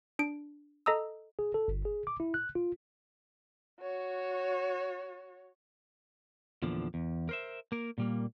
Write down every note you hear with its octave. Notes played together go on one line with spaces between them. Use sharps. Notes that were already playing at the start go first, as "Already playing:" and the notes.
D4 D7
A4 D#5 A#5 D#6 E6
G#4
A4
G1
G#4
D6
E4
F#6
F4
F#4 C#5
E2 A#2 D3 F3
E2
A#4 C5 E5
A#3 A#4
A#2 G3 A#3